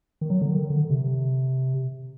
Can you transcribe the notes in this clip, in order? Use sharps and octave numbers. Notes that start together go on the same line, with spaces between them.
D#3
F#3
D3
D#3
D3
C3